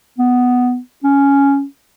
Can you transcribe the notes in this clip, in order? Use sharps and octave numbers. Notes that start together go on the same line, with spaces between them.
B3
C#4